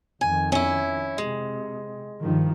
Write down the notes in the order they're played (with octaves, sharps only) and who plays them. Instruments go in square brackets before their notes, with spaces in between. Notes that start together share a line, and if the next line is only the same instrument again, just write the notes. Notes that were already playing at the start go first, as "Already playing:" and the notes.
[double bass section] F2 D#3 [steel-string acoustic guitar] G#5
[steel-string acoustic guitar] C#4 E4
[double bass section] C3 [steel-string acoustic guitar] G#3
[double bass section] G2 D#3 F3